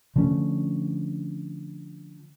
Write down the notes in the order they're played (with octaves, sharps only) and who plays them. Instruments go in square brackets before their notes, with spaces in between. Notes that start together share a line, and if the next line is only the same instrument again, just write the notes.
[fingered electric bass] D3 F3 A3 C#4